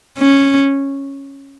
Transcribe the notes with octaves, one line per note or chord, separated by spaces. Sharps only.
C#4